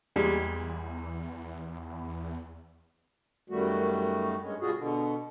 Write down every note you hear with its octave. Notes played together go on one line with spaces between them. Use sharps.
E2 A#2 G3 G#3
F#2 D#3 G3 A3 F#4
G2 G#3 C#4
B2 G3 F4 F#4 G#4
B2 D3